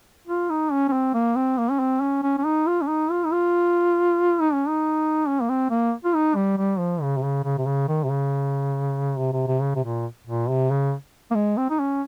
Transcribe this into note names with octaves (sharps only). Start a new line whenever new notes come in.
F4
D#4
C#4
C#4
C4
A#3
C4
A#3
C#4
C4
C#4
C#4
C#4
D#4
F4
C#4
D#4
F4
D#4
F4
D#4
C#4
D#4
C#4
A#3
C4
A#3
F4
D#4
G3
G3
F3
C#3
C3
C#3
C#3
C3
C#3
D#3
C3
C#3
C3
C3
C3
C#3
C3
A#2
A#2
C3
C#3
A#3
G#3
C4
D#4
C#4